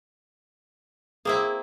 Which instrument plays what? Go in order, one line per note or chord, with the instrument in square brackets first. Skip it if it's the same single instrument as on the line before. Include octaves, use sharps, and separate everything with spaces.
[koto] A#3 C4 E4 [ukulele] G#4